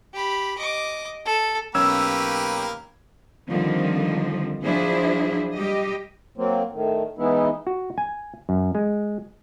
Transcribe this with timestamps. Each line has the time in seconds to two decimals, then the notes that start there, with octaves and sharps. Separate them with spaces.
0.14 G4 B5
0.58 D#5 D6
1.25 A4
1.75 B1 A#3 C#4 G4 B4 E6 G#6
3.49 D3 D#3 F3 G3 C4
4.64 F3 F#3 D4 E4 G#4 C5
5.54 G3 G4 D#5
6.38 F#3 A#3 C4
6.73 A2 D#3
7.18 E3 G#3 B3 D#4 E4
7.67 F#4
7.98 G#5
8.49 F#2
8.75 G#3